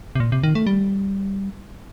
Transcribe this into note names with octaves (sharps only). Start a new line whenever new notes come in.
C3
A#2
C3
D#3
A3
G3